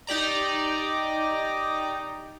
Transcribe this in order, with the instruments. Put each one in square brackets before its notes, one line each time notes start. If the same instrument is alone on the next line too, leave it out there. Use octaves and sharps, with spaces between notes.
[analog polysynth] D#4 G4 D5 A#5